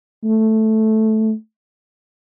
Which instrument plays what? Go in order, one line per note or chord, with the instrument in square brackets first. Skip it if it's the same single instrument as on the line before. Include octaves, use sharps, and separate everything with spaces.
[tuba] A3